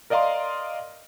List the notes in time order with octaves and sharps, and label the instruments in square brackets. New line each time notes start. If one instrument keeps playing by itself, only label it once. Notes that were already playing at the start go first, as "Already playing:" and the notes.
[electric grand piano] A#4 D5 D#5 F5 A#5 C6